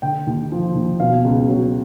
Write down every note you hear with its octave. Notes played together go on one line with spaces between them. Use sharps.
D3 G5
D#2
F3
D#2
B2 F5
C#2
F#3